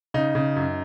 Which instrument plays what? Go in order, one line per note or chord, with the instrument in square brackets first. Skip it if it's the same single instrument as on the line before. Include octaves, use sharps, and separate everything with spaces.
[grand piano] C#3 D#4
C#3
F#2